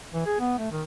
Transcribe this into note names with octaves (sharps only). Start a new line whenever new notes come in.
E3
G#4
B3
A3
D#3